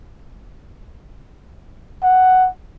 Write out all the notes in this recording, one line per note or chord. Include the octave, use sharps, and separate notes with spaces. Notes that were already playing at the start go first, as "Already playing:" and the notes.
F#5